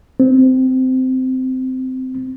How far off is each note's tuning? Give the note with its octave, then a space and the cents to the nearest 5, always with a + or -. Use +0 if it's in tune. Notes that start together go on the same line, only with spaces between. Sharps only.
C4 -15